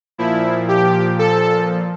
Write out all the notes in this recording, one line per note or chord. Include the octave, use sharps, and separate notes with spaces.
A#2 F3 E4
G4
A4